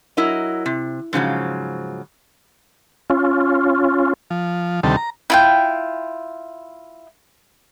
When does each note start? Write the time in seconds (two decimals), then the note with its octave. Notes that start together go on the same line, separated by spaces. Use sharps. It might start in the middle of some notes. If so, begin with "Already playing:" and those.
0.17 F#3 E4 A#4 D#5
0.66 C3
1.13 G#2 C#3 F3 F#3
3.10 C#4 F4
4.30 F3
4.83 D2 C3 D#3 G3 A4
4.97 A#5
5.30 E4 F4 G5